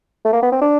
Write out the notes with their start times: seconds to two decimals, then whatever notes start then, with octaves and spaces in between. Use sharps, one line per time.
0.25 A3
0.32 A#3
0.42 B3
0.52 C4
0.61 D4